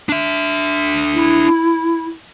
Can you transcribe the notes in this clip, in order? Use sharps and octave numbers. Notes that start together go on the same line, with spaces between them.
D4 E5
E4